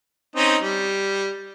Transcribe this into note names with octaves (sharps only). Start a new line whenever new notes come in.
C4 C#4 D#4
G3